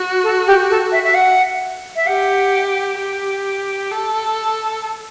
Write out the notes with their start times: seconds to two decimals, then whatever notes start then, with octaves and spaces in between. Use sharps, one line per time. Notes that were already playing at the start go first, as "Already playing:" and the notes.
Already playing: F#4
0.24 A4
0.47 G4
0.70 A4
0.92 E5
1.04 E5
1.15 F#5
1.96 E5
2.07 G4 F#5
2.98 G4
3.91 A4